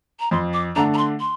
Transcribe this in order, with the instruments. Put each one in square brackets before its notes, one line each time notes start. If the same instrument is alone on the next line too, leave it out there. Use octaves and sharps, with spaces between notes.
[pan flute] A#5
[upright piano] F2 [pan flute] C6
[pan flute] D6
[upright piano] D3 A3 D4 [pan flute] A#5
[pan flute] A#5
C6
C6